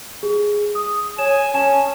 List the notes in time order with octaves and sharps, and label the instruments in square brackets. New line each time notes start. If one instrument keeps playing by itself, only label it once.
[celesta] G#4
D#6
[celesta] C#5 E7 [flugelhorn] G#5
[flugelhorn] C#4 [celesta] G#5 A5 E7